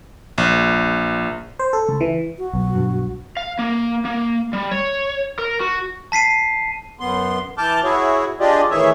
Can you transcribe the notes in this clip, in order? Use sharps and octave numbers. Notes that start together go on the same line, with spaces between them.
A#1
C5
A4
C#2
E3
F#4
B1
B1 G2
F5
A#3
A#3
G3
C#5
A#4
F#4
A5 B6 C7 D#7
F#2 B3 C6
E3 A5 D6 F6 G6
E4 F#4 G#4 C#5
D4 F4 G4 G#4 D5 D#5
A2 D#3 E3 G#4 C#5 E5